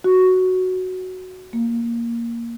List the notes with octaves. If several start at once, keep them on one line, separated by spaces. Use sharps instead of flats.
F#4
A#3